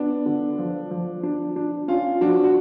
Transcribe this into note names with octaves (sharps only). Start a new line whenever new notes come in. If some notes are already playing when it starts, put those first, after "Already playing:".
Already playing: B3 D4
D3
F3
F3
D4
D4
C#4 F4
F3 D4 F#4
F#4